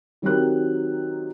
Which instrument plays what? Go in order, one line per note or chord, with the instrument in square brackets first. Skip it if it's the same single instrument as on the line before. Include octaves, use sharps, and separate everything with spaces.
[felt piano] D#3 F#3 C4 G4 A#4 F#6